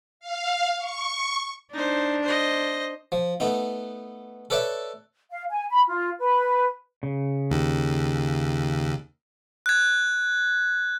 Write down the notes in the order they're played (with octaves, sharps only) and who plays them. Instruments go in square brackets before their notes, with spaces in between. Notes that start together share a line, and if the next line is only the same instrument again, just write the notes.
[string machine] F5
C#6
[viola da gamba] D4 [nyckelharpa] D#4 C5
[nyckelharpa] C5 D#5
[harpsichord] F3
A3 B3 D#4
A4 B4 C#5 D5 E5
[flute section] F5
G#5
B5
F4
B4
[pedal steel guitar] C#3
[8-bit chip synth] D#2
[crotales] F#6 G#6